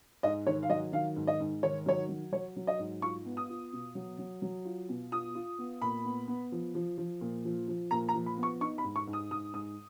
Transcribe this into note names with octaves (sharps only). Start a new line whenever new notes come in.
G#2 D#5
D#3 C#5
F5
F#3 D#5
D#3 F5
G#2
D#5
G#2
D#3 C#5
F#3 C#5
F#3
F#3 C#5
F#3
D#5
G#2
F4 C#6
B3
D#6
F4
B2
F#3
F#3
F#3
F4
B2
F4 D#6
F4
B3
A#2 B5
B3
B3
F3
F3
F3
A#2
F3
F3
A#2 A#5
A#5
F3
B5
B3
C#6
D#4 C#6
B5
G#2
C#6
G#2
D#6
G#2 D#6
G#2 D#6